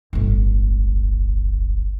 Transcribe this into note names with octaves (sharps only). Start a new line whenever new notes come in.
D1 G1